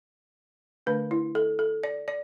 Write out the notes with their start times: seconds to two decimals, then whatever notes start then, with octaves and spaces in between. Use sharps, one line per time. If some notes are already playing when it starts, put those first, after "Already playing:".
0.86 D3 A3 D4 B4
1.11 E4
1.35 A4
1.59 A4
1.83 D5
2.08 D5